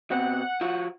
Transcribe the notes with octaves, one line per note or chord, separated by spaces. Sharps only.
B2 C4 F#5
F3 F4 F#4